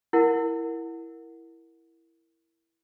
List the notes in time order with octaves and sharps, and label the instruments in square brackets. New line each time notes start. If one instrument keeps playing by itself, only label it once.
[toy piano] E4 A#4 F#5